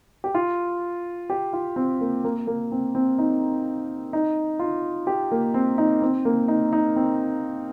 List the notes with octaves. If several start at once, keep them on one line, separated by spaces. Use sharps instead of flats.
G4
F4
G4
F4
C4
A#3
A#3
A#3
C4
C4
D#4
D#4
F4
G4
A#3
C4
D#4
C4
A#3
D#4
D#4
C4